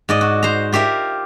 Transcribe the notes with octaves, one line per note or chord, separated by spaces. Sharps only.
G#2 D5 D#5
F#4
C5 A#5
F4 G4 A#4 E5